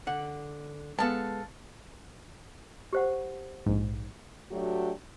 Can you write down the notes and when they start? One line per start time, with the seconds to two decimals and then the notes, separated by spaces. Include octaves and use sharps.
0.07 D3 F#5
0.99 G#3 B3 A4 F5 A5
2.93 G4 C5 F#5
3.66 A#1 G#2
4.51 F#3 A3 D4 F#4 G4